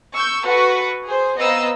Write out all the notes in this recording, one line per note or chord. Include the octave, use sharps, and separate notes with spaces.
C#6 E6 G6
F#4 A4 B4 C#6
G#4 C5
B3 C4 D#5 F5 A#5 E6